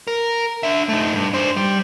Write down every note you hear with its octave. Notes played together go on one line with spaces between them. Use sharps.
A#4
D4 E5
A3 D#4
G2
D4 C5
G3